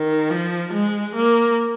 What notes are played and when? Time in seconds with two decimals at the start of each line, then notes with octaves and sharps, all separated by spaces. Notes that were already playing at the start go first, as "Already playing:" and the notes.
Already playing: D#3
0.30 F3
0.73 G#3
1.16 A#3